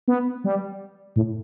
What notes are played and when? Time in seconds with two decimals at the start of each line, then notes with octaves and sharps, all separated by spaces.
0.08 B3
0.44 G3
1.16 A2